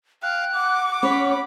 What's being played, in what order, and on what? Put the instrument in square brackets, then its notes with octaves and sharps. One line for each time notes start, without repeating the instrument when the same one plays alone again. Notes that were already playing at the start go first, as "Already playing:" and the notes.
[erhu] F5 [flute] G5 [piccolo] F#6
[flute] F#5 [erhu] D6
[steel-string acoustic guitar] C#4 C#5 [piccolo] B5